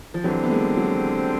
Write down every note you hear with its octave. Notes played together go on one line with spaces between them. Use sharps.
F3
D3 E3 F#3 G3 C4
B3
G#3 A#3
F#3 G#3